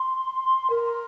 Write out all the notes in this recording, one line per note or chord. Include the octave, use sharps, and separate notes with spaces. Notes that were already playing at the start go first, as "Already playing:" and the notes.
Already playing: C6
A#4